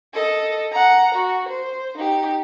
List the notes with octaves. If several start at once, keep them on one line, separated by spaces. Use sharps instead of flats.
A4 D#5
F#5 A#5
F#4
C5
D#4 G4